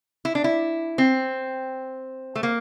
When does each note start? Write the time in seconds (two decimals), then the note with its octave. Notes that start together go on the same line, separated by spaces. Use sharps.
0.25 E4
0.35 D4
0.44 E4
0.98 C4
2.36 A3
2.43 A#3